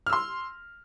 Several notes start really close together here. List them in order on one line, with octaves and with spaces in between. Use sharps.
F6 E6 C6